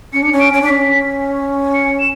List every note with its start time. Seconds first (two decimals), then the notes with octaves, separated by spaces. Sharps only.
0.13 C#4 C#7
0.23 D4
0.32 C#4
0.40 D7
0.53 C#4
0.62 D4
0.66 C#4 B6
1.74 C#7
2.00 E7